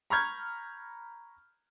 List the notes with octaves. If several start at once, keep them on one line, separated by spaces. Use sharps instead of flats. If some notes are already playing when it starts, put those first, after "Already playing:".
A#5 B5 C#6 F6 G6 G#6